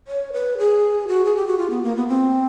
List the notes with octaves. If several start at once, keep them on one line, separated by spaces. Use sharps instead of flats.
C#5
B4
G#4
F#4
G#4
G4
F#4
F4
B3
A#3
B3
C4